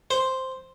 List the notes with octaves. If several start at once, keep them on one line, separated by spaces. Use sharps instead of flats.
C5